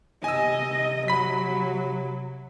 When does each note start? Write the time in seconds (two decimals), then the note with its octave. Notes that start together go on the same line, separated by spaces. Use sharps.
0.24 C3 D#5 G#5 E6
1.08 F#3 B5 B6